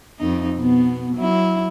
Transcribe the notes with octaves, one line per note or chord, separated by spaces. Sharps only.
F2 D#4
B2 B3
F#3 E4